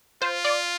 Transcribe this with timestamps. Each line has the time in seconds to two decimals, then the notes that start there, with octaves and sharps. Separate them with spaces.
0.22 F4 C5
0.45 D5